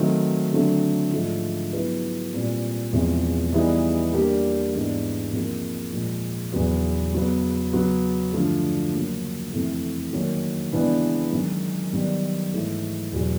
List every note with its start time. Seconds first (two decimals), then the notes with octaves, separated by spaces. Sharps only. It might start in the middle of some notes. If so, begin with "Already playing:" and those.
Already playing: D#3 F#3 A3 C4 D#4
0.52 D3 F#3 A3 C4
1.13 G#2 F3 A3 D4 F4
1.73 F#3 B3 E4 G#4 B4
2.32 A#2 G3 C4 F4
2.93 E2 C3 F3 G#3
3.53 E3 G3 B3 D#4 G#4
4.13 G3 A#3 D4 G4
4.73 G#2 E3 G#3 B3 D4
5.32 C3 F3 A#3 D#4 G#4
5.93 A#2 F3 G#3
6.52 E2 C#3 F#3 B3
7.13 C#3 F#3 B3
7.73 C#3 F#3 B3
8.32 G2 D3 F3 A3
8.93 C#3 F#3 A#3 C#4
9.52 F2 C3 E3 A3
10.13 D#3 F#3 A#3 C#4
10.73 C#3 E3 G#3 B3 D4
11.32 F#2 D#3 G#3
11.92 F#2 D#3 G3 B3
12.52 G#2 E3 A3 C#4
13.13 E2 B2 F#3 B3